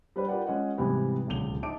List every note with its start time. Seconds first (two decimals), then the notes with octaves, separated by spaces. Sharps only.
0.16 G3 D4 B4 C5 D5
0.29 F4 G4 A#4 B4 D5 F#5
0.47 G#3 C#4 F4 D#5 F#5
0.78 G#2 C3 E3 G3 B3
1.27 D1 C#2 B2 D3 F7 G7
1.63 D#4 E5 A5 D6 D7